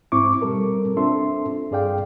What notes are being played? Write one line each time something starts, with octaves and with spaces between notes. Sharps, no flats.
G#2 C4 E4 C#6 D6
B2 G3 C4 A4 A#4
C4 D4 F4 A4 E5 C6
G2 G#4 D5 F5 G5